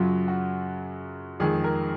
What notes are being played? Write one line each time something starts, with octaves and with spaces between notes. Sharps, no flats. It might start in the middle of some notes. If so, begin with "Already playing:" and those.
Already playing: F#2 C#3 F#3 F4
F#4
F2 D#3 G#3 G#4
A#4